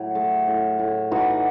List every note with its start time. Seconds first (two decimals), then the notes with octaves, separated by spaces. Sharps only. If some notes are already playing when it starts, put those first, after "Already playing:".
Already playing: A2 F#3
0.15 A3
0.48 A2
0.79 A2
1.11 E3 D#4 F#4